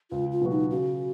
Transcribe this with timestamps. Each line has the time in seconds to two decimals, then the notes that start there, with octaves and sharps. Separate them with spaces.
0.11 C#2 F4
0.31 F4
0.41 B2 F#3 B3 F#4
0.51 D#4
0.71 C#3 F#4